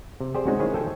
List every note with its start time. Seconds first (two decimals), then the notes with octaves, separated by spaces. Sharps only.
0.20 C3
0.35 G4 G#4 C5 D5
0.47 G#3 C4 C#4 D#4 F#4
0.60 D#3 E4 G#4 C5 C#5
0.74 A4 G5 G#5